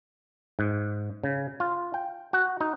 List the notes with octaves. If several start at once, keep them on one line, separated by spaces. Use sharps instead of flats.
G#2
C#3
F4
G5
F#4
D#4